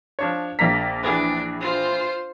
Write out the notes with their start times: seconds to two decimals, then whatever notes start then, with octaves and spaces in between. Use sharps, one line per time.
0.19 F3 D4 C#5
0.59 A#1 A#3 A#5 B6
1.03 E3 D4 G#4 B4
1.61 F4 C5